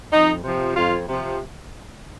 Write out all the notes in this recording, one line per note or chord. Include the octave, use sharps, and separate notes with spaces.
F2 D#4
C3 F3
F2 F4
C3 F3